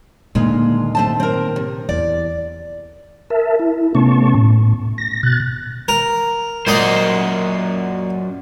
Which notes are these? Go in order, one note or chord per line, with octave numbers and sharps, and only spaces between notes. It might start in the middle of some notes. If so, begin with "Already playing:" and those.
D2 A#2 D#3 G#3 F4
A3 C4 A5
C4 A#4
C3
E2 D5
A#4 E5 A5
E4
C3 A3 B3 C#4 A5 C#6
A2
A#6
B2 F#6 A6
A#4
F#2 A#2 C5 D#5 F#5